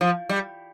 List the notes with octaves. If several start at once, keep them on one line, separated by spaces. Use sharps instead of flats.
F3
G3